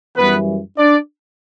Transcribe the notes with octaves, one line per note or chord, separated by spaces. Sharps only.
F#2 E3 G3 B3 B4
D4 D5